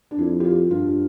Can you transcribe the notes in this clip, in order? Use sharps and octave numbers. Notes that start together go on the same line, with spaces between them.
D4
F2 E4
G4
F4
G2 F4